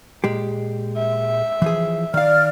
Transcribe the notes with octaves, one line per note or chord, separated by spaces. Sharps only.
A#2 G#3 G4
E5
E3 F3 G#4
D#3 D5 F5 F6